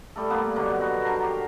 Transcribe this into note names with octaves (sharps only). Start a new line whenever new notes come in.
G3 A3 A4
G3 A#3 B3 F4
B2 D3 F#3
B3 F#4
A#4 C5 A5 A#5
G4